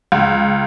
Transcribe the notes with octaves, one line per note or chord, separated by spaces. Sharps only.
C#2